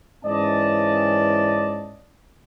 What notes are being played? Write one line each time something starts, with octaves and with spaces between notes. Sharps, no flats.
G#2 E3 C#4 D5 D#5 A5